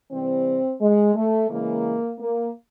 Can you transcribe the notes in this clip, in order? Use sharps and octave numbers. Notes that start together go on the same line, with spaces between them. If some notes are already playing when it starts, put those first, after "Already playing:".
C3 E3 G3 C4
G#3
A3
C#3 E3 G#3 A#3
A#3